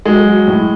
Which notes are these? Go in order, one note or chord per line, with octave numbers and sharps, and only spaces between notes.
F#3 G#3
F#3
A2